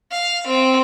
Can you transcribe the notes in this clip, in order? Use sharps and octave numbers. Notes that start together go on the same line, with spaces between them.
F5
C4